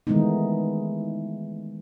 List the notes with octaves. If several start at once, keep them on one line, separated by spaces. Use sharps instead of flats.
D#3 E3 G#3 A3 B3 D#4